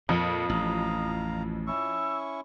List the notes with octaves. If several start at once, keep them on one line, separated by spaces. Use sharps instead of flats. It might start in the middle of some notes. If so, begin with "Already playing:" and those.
F2 A#2 D#5 F5 D#6
A1 F5 A#5
C#4 E4 C#6 E6